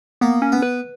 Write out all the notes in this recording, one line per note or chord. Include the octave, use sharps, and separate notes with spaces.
A#3 B3
C#4
B3
B4